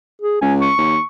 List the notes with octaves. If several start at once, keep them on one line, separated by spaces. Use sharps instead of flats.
G#4
C#2 G#5
C#6
D#2